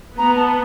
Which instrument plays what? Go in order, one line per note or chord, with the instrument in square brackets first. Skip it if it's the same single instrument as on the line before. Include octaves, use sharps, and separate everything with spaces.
[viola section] B3 [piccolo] A#5
[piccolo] A5